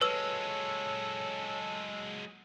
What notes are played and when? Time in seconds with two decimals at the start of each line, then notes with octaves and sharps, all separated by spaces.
0.01 F#3 G#3 A4 B4 C#5 E6